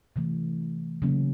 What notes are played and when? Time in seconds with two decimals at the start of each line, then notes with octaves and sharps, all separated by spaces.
0.16 C3 E3 A3
1.02 C#3 F#3 A#3 C#4